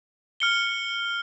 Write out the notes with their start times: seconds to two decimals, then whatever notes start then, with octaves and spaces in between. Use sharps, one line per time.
0.40 F6 C#7 G7